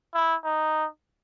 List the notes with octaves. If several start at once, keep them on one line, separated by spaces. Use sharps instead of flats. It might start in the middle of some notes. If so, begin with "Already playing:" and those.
E4
D#4